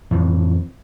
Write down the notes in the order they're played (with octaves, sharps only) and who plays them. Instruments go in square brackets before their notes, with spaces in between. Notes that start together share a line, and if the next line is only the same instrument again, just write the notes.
[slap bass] F2 A2 E3